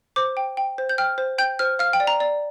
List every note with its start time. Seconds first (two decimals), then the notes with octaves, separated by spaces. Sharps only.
0.16 C5 D6
0.37 G5
0.57 G5
0.78 C5
0.89 G6
0.98 G5 F6
1.18 C5
1.38 G5 G6
1.59 C5 F6
1.79 F5 F6
1.93 G5
2.00 D5
2.07 A#5
2.20 D5